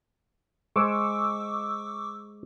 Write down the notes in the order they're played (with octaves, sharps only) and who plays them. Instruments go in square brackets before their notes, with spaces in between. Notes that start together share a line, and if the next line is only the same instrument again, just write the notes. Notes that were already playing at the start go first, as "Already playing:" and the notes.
[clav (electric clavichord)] G#3 C5 [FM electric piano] C#6 D6 E6